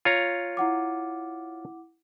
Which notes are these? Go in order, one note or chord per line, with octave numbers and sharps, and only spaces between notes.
F4 C#5 A#5
E4 F#5 D6